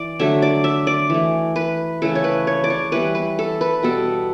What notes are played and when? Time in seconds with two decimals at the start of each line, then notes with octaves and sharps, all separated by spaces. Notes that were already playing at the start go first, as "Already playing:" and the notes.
Already playing: E3 D5
0.19 D3 F#3 A3 E5
0.42 D5
0.64 E5
0.87 D5
1.10 E3 A3
1.56 B4
2.02 C#3 E3 A3 A4
2.15 C#5
2.24 B4
2.47 C#5
2.64 D5
2.70 C#5
2.92 E3 G3 B3 B4
3.15 B4
3.39 A4
3.61 B4
3.83 B2 G3 B3 A4